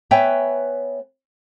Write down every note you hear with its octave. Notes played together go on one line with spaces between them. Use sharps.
B3 B4 C#5 E5 G5 G#5